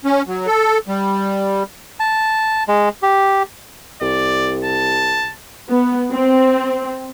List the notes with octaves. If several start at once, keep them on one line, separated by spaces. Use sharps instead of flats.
C#4
F#3
A4
G3
A5
G#3
G4
C2 D5
A5
B3
C4